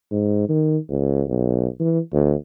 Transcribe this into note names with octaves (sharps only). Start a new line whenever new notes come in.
G#2
D#3
C#2
B1
E3
D2